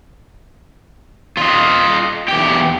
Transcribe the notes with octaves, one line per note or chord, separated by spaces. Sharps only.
F4 D#5
E2 G4